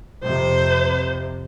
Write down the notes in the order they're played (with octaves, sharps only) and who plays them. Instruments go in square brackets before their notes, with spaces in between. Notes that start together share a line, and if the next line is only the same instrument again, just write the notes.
[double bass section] F2 C3 [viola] C5